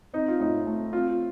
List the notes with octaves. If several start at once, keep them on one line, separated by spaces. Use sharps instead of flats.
C4 D#4
F4
A2 D#4
A3
C4 F4